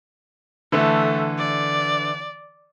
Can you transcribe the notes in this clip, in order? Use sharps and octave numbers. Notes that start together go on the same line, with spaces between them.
D3 E3 A3
D5